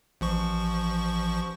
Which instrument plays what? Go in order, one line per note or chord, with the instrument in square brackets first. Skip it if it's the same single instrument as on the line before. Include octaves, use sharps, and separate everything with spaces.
[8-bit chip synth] A1 F3 C#6